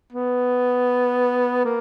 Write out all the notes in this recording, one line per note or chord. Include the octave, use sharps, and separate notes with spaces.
B3
A#3